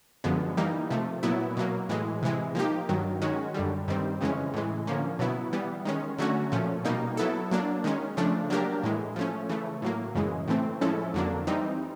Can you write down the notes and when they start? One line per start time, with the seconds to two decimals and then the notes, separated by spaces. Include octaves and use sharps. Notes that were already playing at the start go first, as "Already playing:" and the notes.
0.24 F#2 D3 F3 G#3 B3
0.57 E3 G3 A#3 D#4
0.90 C3 F3 A3
1.23 A#2 F#3 B3 E4
1.57 B2 F#3 A#3
1.89 A2 E3 G#3
2.22 C3 E3 G#3
2.55 F3 A#3 D#4 G4
2.89 G2 D#3 F#3
3.22 D#3 G#3 C#4 F#4
3.54 F#2 D3 G3
3.88 G2 D#3 G3 C4
4.21 F2 C#3 E3 G#3 C#4
4.54 A2 E3 G#3
4.87 D3 F3 A#3 C#4
5.19 B2 F#3 B3 E4
5.53 E3 G3 B3
5.85 D#3 G#3 C#4
6.18 D3 F#3 A3 C#4 F#4
6.52 A#2 F3 A3 C#4
6.85 B2 G3 A#3 D#4
7.17 F#3 B3 E4 A4
7.51 F#3 A#3 D4
7.84 D#3 G#3 C#4
8.17 C#3 F3 A3 D4
8.50 F#3 A#3 D4 G4 A#4
8.83 A2 E3 G#3
9.16 F3 A3 C#4
9.49 C#3 E3 A3
9.82 A2 F#3 A#3
10.15 F#2 C#3 E3 G#3
10.48 A2 E3 A3 C4
10.81 F3 G#3 C#4 E4 A4
11.14 F2 D3 F#3 A#3 D4
11.47 E3 G3 C4 D#4